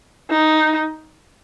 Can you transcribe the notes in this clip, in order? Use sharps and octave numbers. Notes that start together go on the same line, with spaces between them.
D#4